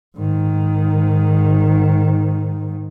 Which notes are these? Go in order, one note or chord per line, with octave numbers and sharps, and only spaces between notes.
G#2 D#3